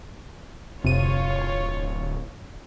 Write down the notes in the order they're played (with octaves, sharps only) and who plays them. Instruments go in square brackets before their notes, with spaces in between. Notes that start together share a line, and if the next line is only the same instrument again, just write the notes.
[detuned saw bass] D1 [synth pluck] F2 C3 D#7 [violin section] F4 C#5